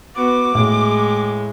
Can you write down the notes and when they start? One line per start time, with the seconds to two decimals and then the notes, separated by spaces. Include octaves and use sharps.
0.16 B3 F#4 D6
0.55 A2 G#3